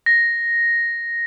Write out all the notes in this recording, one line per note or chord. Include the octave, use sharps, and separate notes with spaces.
A#6